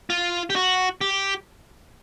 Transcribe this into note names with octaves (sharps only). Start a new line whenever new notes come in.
F4
G4
F#4
G4